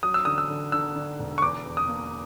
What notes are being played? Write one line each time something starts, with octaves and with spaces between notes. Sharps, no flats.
F#3 D#6
E6
D3 D#6
E6
D3
D3 E6
D3
E1
C#6
E2 D6
E2
D#6
A#3